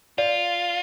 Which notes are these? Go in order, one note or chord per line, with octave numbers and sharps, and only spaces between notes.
F4 D5